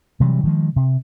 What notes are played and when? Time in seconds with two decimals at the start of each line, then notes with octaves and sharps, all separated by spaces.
0.20 C3 E3 F#3 G3
0.43 D#3 F3 G#3
0.76 C3